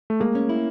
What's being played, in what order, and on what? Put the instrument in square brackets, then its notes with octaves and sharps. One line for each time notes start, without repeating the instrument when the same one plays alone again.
[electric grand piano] A3
[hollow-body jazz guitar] G#3 [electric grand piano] A#3
[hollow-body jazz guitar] C#4
E4